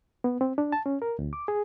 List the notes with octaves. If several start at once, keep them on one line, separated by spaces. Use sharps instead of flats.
B3
C4
D4
A5
C#4
A#4
D2
D6
G#4